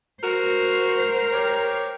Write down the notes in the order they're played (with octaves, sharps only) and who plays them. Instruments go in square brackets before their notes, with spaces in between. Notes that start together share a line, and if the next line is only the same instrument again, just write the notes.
[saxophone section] F#4 [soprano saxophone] A#4 [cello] C5
[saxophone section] G4 C#5